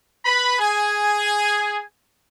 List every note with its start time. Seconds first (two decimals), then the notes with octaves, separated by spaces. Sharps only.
0.24 B4 B5
0.59 G#4 G#5